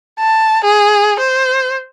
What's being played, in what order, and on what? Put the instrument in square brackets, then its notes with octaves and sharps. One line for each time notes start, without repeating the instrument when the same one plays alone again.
[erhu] A5
G#4
C5